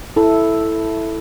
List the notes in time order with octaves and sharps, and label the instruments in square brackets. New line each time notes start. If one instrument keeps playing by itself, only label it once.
[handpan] E4 A4